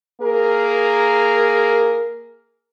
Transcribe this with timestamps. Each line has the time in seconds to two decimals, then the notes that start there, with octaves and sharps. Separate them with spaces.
0.22 A#3 G#4 A#4